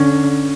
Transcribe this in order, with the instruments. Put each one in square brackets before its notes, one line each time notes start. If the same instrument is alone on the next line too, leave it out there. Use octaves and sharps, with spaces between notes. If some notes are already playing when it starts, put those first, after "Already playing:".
Already playing: [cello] D3 [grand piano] C#4